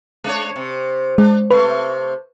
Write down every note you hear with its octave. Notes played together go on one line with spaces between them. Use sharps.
G#3 D4 C#5
C3
G#3 D4
C3 A3 B4